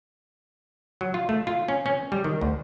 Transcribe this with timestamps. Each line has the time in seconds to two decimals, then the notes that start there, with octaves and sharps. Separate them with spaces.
1.01 F#3
1.14 F4
1.29 A3
1.47 F4
1.68 C#4
1.86 C#4
2.12 G3
2.24 D#3
2.41 D2